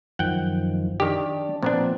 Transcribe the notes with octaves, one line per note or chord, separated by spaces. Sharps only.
F#2 D#3 F3 F#5 G5
D#3 D4 G4
A#2 F3 B3 C4 D4